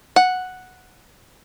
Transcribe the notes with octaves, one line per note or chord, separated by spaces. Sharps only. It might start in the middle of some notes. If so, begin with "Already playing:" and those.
F#5